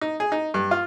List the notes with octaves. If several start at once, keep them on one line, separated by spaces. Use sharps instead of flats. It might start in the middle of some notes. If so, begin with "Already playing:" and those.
D#4
G#4
D#4
G2
F4